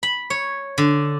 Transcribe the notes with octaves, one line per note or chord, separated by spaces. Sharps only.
B5
C#5
D3